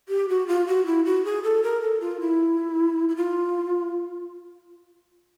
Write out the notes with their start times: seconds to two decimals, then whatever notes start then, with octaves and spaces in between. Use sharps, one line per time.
0.09 G4
0.29 F#4
0.48 F4
0.67 F#4
0.86 E4
1.05 F#4
1.25 G#4
1.44 A4
1.63 A#4
1.82 A4
2.01 F4
2.20 E4
3.09 E4
3.16 F4